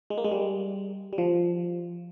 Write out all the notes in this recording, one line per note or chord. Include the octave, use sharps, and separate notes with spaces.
G#3
A#3
G#3
G3
G3
F3